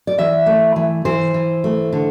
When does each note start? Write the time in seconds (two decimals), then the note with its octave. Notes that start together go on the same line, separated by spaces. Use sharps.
0.07 D5
0.18 E3 E5
0.46 A3
0.76 E3
1.05 E3 C5
1.34 E3
1.64 A3
1.93 D3